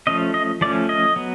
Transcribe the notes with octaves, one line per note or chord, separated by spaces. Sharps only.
F3 A3 C#4 D#5
D#5
F3 A3 C#4 D5
D#5
F#3 B3